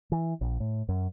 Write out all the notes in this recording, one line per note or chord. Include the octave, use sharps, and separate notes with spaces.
E3
A#1
A2
F#2